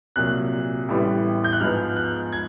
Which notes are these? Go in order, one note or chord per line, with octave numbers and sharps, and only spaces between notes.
C2 A#2 F#3 F#6
A1 A2 E3 G3 B3
G6
F#6
G#2 F3 G#3 B3 F6
F#6
G#6